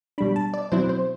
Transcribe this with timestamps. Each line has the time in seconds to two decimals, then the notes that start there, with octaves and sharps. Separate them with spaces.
0.18 B2 G3 D4 B5
0.36 A5
0.54 D5
0.72 B2 F#3 C4 E4 C5
0.89 C5